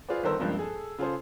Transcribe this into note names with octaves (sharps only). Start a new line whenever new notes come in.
F4 G#4 B4 C5 D5
G1 D#3 A4 A#4 C5 E6
C#2 G2 F3 A#3 C4
G#4 A4
C#3 F4 G#4 A4 C5